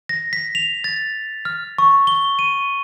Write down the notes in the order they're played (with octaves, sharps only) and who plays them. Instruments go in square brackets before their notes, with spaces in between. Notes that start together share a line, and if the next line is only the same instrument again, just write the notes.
[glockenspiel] A#6
B6
F7
A6
F6
C#6
G7
D#7